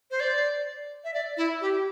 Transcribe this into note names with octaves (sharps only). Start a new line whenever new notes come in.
C5
D5
E5
D5
E4
G4